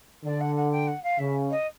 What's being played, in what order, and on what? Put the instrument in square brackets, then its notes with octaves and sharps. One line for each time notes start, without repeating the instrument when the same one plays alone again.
[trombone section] D3 [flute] D5
[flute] F#5
F#5
G5
F#5
F5
[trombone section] C#3 [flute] E5
[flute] D#5